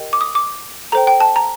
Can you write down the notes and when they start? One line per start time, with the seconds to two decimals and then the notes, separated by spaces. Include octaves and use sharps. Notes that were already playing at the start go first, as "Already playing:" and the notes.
Already playing: G4 A#4 D#5 G5
0.13 D6
0.21 D#6
0.35 D6
0.92 A4 C5 G5 A#5
1.07 G5
1.20 A5
1.36 A#5